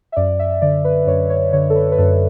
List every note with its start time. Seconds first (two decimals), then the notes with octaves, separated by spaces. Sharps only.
0.12 E5
0.16 F#2 D5
0.39 E5
0.62 D3 D5
0.84 B4
1.07 F#2 C#5
1.30 C#5
1.53 D3 C#5
1.70 A4
1.76 B4
1.92 B4
1.99 F#2 A4